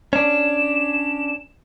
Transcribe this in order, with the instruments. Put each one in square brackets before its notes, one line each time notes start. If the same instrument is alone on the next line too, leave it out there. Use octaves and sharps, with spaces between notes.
[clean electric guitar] C#4 D4 [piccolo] E7